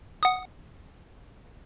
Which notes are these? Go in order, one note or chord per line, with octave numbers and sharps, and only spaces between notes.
F#5 D#6